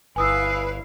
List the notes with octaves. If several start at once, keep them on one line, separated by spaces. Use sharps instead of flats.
G1 E4 B4 F5 G#5 D#6 E6